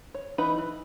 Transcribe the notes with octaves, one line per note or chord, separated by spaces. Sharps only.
C#5
E3 D#4 B4 F#5 B5
E3